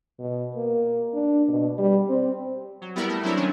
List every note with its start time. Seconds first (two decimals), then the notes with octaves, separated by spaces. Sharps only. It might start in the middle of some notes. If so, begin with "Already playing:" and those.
0.19 B2
0.56 A#3
1.14 D4
1.48 B2
1.79 G3
2.09 C4
2.81 F#3
2.95 G3 B3 E4 A#4
3.09 A3
3.23 F#3 C4 D4 E4 A#4
3.36 D#3 F#3 C#4 D4